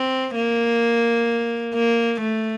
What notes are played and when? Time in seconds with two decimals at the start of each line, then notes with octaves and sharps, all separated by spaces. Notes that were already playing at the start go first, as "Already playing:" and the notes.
Already playing: C4
0.35 A#3
1.75 A#3
2.21 A3